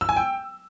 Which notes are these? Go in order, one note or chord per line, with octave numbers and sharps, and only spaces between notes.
E6
G#5
G5